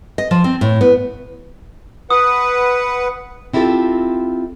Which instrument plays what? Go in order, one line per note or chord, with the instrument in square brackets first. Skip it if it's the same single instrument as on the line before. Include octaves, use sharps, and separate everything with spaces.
[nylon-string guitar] D#5
F3
C4
A2
B3
[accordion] B4 F#5 [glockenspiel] D#6
[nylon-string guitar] C4 E4 F4 G4 A4